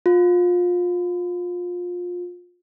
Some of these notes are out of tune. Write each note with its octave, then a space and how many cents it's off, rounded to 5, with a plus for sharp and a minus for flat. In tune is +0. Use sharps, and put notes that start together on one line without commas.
F4 +25